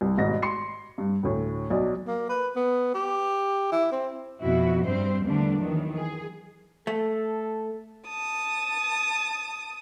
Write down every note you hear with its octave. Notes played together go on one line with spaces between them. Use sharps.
C2
G#1 G#2 B2 A#6
C6 C7 C#7
G2
D2 A2
B1 F#3 D5
A#3
B4
B3
G4
E4
C4
F2 B2 E4 F#4
G2 G3 C4 C5
E2 D3 G3 A3 A#3 D4
D#3 E3 F#3
G#4
A3 A4
A5 D#6